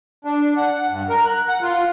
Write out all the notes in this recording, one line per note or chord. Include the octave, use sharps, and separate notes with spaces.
D4
F#5
G2
A#4
F#6
F#5
F4